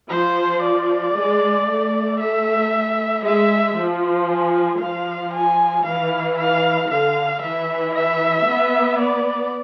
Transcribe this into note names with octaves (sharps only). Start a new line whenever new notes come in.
F3 C5
D5
G#3
A3
E5
G#3 E5
F3
G#5
F3 F5
G#5
E3 F5
F5
D3 F5
E3 E5
E5
B3
D5